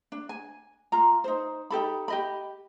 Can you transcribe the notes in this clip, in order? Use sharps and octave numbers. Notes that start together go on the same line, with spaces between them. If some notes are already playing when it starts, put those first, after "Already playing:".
D4
G#5
F4 A#5
D#4 C5
D#4 G4 A4 B5
G4 D#5 B5